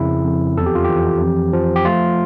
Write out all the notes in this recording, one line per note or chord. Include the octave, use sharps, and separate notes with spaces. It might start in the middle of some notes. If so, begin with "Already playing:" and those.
Already playing: F2 C#3 E4
F2
E2 A4
G4
F4
G4
E3
F2
F3
G4
A3 F4